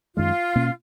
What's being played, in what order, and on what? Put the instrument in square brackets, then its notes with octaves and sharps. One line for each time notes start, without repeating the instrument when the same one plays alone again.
[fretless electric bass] F#2 D#3 G#3 [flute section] F4
[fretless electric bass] B2 A#3 C#4